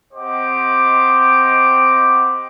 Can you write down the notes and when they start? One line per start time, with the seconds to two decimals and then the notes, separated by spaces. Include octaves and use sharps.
0.12 C4 G4 C5 D#5 F#5 D6